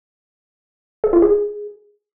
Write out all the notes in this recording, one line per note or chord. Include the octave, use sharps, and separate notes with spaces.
A4
F4
G#4